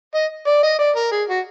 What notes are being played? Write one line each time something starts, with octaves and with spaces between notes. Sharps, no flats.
D#5
D5
D#5
D5
A#4
G#4
F#4